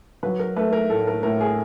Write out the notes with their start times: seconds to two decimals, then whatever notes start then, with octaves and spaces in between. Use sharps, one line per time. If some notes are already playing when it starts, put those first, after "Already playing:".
0.23 F#3 B4
0.39 A#4
0.56 A3 B4
0.73 A#4
0.90 A2 A4
1.07 A#4
1.23 A2 A#4
1.41 G#4